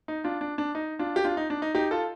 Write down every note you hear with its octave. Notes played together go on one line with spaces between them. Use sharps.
D#4
D4 F4
D4
D4
D#4
D4 F4
G4
D4 F4
D#4
D4
D#4
D#4 G4
F4 A4